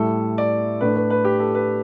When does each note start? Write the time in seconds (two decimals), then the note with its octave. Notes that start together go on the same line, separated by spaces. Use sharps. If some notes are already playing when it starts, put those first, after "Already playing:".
Already playing: A2 G3 E4 A4
0.38 D5
0.81 A2 A3 D4 B4
0.96 B4
1.10 B4
1.25 G4
1.40 A4
1.55 B4